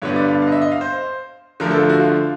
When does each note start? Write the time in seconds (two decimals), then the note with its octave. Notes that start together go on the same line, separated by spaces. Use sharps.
0.02 G2 D3 G3 B3 D4 C#5
0.16 D5
0.28 F5
0.42 F5
0.47 D#5
0.52 E5
0.62 D#5
0.72 F5
0.81 C5
1.60 D3 F3 A3 A#4
1.71 A4
1.80 F4
1.89 F#4
2.00 F4